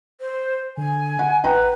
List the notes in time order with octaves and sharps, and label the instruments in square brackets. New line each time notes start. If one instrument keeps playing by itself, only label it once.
[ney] C5
[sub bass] D3 [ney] G#5
[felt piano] F#5
[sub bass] A1 [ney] B4 [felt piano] F#5 G5 A#5